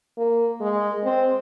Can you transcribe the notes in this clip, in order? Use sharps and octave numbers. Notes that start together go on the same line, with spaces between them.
A#3
G#3
C4